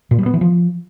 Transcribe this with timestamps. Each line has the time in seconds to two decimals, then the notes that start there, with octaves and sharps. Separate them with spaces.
0.11 A#2
0.19 G3
0.26 B3
0.34 E3
0.41 F3